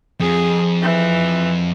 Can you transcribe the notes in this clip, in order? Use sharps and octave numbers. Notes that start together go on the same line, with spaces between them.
F2 G#4
E3